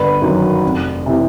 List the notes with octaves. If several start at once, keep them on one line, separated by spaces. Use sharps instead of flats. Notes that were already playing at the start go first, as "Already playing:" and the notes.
Already playing: G1 B4
F#2 D#3 F#3
F1
C3 E3